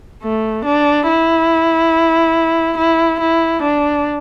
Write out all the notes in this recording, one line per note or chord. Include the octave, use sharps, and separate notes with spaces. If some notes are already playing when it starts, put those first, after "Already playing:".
A3
D4
E4
E4
E4
D4